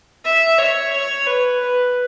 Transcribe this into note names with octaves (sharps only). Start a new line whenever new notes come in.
E5
C#5
C#5
B4
B4